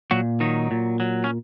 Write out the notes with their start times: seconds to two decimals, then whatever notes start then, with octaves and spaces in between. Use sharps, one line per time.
0.11 A#2 F#3 F#4
0.40 D#3 F#3 D#4
0.71 A#2
1.00 F#3
1.24 C#4